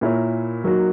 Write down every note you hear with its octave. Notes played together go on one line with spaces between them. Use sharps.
A#2 A#3 E4 A#4 C#5
F#3 A#3 D#4 F#4